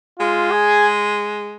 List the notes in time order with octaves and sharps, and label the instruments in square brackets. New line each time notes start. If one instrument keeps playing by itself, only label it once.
[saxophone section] G#3 [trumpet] F4
[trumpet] G#4